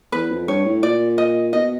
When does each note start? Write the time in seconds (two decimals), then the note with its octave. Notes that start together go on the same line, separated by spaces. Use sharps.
0.12 E2 B4
0.31 F2
0.47 G2 C#5
0.65 A2
0.82 A#2 D5
1.18 D#5
1.53 B2 D#5